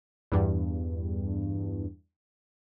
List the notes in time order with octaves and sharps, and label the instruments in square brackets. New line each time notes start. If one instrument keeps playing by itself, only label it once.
[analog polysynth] E2 G2